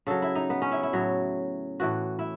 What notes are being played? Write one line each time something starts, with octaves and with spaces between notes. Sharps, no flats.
C#3 F#3 A4
E4
D#4
B3
C#4
E4
E4
A2 F#3
A2 E3 F#4
E4